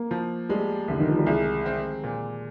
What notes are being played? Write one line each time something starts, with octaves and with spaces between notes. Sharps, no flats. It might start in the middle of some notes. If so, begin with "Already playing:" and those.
Already playing: A#3
F3
G3 G#3
C2 D3
D#3
F3
G3
C2 G#3
C4
A#2